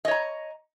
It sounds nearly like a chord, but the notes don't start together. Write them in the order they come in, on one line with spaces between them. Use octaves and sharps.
D#5 C#5 A#5